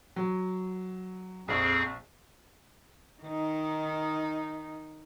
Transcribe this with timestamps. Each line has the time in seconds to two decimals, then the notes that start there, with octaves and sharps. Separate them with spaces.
0.16 F#3
1.48 A#1 F2 C4 G#4
3.22 D#3 D#4